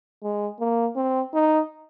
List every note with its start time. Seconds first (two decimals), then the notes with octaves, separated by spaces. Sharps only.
0.23 G#3
0.60 A#3
0.96 C4
1.34 D#4